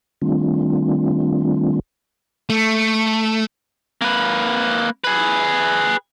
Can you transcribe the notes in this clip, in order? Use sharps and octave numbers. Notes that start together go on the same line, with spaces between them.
D#3 G3 A3 C4 D4 F4
A3
A#3 B4
G#4 B4